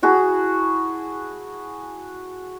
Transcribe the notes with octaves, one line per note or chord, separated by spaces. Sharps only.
E4 F#4 G#4 A5